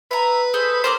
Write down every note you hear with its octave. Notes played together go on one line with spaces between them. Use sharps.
B4 E5 A#5
G#4 A4 C5
C4 A#4 C5 D6